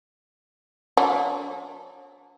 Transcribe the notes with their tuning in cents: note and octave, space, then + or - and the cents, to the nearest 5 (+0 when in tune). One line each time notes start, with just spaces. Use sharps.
F#3 -35 D4 -30